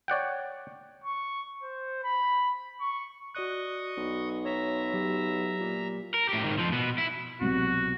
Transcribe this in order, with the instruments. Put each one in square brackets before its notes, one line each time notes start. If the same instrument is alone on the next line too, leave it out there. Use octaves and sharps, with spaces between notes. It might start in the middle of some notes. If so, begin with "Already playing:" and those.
[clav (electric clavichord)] C#5 D5 F#5 G5
[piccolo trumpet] C#6
C5
B5
C#6
[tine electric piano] F#4 D5 F#6 [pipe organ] D#5 C#6 D#6
[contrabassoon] B1
[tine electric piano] C#5 [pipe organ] E5 A#5
[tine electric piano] F#3 G4
[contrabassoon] A#2
[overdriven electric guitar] A#4
A2 G4
G#2 D#3
F2 F3
B2 B3
E4
[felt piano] C2 B2 F#3 [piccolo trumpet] F#4